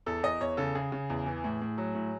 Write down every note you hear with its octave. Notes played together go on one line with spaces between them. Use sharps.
E2 A4
E2 D#5
E2 C#5
C#3 A4
C#3 G#4
C#3
E2
E3
A2
A2
F#3
A2